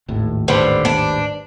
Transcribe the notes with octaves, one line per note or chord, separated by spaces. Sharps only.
G#1 D#2 A2
D3 G3 B4 C5
D4